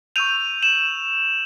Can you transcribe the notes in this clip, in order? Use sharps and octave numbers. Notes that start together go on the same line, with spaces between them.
C#6 E6 G6 D#7 F7
E7 F#7